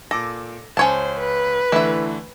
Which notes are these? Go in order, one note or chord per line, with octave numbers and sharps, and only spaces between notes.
A#2 A4 D6 A#6
C#2 C#4 C5 C#5 A5
B4
D3 E3 A3 E4 E5